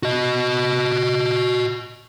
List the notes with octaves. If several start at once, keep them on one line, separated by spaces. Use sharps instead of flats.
F#4 D#5